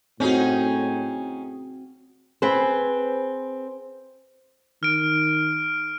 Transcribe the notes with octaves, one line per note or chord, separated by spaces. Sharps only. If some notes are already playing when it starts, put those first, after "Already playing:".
A2 C4 C#4 D#4 F#4 G#4
C4 G#4 B4 C5
D#3 F6 D7